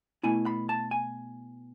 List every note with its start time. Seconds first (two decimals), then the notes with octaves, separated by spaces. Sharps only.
0.23 B2 A3 E4 G#5
0.46 B5
0.69 A5
0.91 G#5